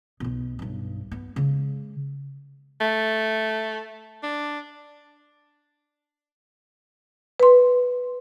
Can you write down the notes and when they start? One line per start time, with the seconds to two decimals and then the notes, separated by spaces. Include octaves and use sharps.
0.20 B1 B2
0.59 B1 G2
1.11 B3
1.36 C#3 G#3
2.81 A3
4.23 D4
7.40 B4 C6